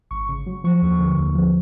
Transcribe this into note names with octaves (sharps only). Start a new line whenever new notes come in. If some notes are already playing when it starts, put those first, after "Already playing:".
G#1 C#6
C#3
F#3
F3 C#6
D#2
D3
D#2
F3